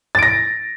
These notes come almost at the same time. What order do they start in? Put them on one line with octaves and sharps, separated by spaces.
A6 D7 A#6